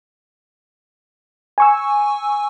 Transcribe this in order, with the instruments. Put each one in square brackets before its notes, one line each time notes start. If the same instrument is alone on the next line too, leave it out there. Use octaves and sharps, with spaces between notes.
[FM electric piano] G#5 C#6 E6